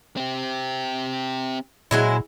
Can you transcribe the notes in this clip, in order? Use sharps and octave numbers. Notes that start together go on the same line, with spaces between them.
C4 G4
A#2 F#3 G#3 E4